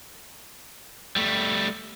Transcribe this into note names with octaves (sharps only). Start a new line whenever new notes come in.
G3 A3